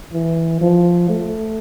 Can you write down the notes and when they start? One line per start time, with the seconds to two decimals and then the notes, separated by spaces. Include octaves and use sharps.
0.13 E3
0.61 F3
1.09 A3